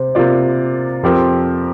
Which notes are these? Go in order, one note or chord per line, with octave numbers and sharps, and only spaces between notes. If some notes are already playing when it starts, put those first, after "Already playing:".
Already playing: C3 C5
C3 A#3 F4 D5
F2 F3 C4 G4 A#4